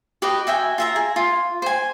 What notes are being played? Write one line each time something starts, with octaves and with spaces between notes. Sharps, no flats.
F#4 G4 B4 D#5
F#4 E5 G5 G#5
F4 E5 A#5
G#4
F4
C5 G#5